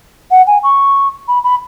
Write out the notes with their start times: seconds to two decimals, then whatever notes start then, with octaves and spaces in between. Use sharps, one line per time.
0.31 F#5
0.47 G#5
0.63 C#6
1.28 B5
1.44 B5